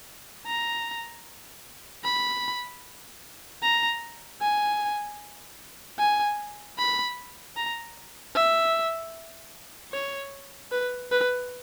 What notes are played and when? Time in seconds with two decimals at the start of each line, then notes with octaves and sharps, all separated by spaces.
0.47 A#5
2.04 B5
3.62 A#5
4.41 G#5
5.99 G#5
6.78 B5
7.57 A#5
8.35 E5
9.92 C#5
10.72 B4
11.11 B4